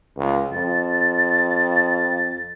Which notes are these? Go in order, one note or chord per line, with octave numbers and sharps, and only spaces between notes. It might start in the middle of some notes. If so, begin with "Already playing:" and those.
C#2
F2 A6